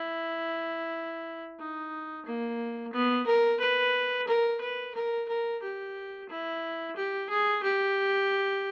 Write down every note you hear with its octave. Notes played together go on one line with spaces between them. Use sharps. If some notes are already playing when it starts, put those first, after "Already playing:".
Already playing: E4
D#4
A#3
B3
A#4
B4
A#4
B4
A#4
A#4
G4
E4
G4
G#4
G4